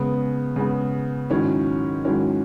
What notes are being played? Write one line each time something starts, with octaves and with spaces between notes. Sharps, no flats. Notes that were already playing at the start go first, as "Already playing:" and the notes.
Already playing: C#3 G#3 B3
C#3 G#3 B3
G#2 D#3 F#3 C#4 E4
G#2 D#3 F#3 C#4 E4